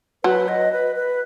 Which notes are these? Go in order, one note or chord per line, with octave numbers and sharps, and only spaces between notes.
F#3 B4
D#5
B4
B4